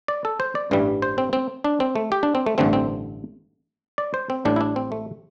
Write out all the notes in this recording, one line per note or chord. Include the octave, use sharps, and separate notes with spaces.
D5
A4
C5
D5
A1 G2 E3 G3
C5
C4
C4
D4
C4
A3
G4
D4
C4
A3
A1 G2 D3 A3 C4
C4
D5
C5
C4
A1 A2 G3 D4
E4
D4
C4
A3